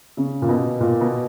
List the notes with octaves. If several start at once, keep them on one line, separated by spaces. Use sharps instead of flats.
C#3
A#2
B2
A#2
B2